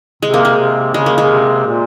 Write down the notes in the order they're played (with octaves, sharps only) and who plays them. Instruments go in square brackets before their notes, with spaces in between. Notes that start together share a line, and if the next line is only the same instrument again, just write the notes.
[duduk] C3 [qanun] G#3
[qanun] A#3
G#3
[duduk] C3
[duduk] C#3 [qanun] G#3
[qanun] A#3
G#3
[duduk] C#3
C3
A#2